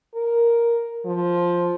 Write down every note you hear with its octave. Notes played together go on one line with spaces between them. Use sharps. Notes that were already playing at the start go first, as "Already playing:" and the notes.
A#4
F3